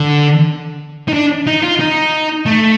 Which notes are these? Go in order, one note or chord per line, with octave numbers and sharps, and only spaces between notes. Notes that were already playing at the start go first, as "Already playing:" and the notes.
Already playing: D3
D#4
D4
D#4
F4
D#4
A3